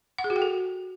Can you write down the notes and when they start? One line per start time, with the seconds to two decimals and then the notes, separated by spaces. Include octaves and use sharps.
0.18 F#5
0.24 G#4
0.30 F#4
0.36 G5
0.42 A4